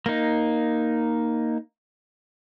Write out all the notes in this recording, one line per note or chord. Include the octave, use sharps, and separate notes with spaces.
A#3 D#4